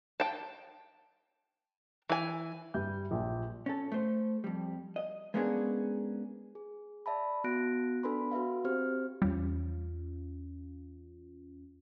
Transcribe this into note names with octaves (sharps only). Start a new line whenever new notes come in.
G5 A5
E3 G#5
G2 G3 E5 G6
A#1 A#2
C#4 A4
A3 C5
F2 G3
D#5
G#3 A#3 B3 C#4 D4 G#4
G#4
D5 E5 A5 B5
B3 F#4 F#6 A#6 D7
B3 D4 A4 B4 B5 C6
F#4 B4 E5 F5
C4 G4 C5 F6
E2 G3 C#4 F4